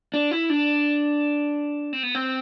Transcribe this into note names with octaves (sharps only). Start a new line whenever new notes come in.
D4
E4
D4
C4
B3
C4